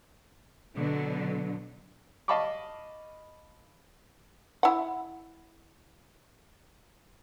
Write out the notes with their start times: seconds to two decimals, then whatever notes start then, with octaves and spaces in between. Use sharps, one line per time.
0.75 B2 D3 F#3
2.28 D#5 F5 A5 B5 C#6 D6
4.63 E4 F#5